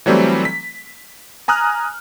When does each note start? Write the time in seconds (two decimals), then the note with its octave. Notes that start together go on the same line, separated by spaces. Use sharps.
0.06 E3 F#3 G3 A3 C4
0.45 B6
1.48 G#5 A#5 D#6 F6 F#6